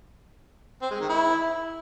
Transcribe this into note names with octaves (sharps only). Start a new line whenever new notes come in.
C4
G#3
D#3
E4